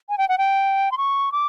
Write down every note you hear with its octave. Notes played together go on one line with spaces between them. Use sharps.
G#5
G5
F#5
G5
C6
C#6
D6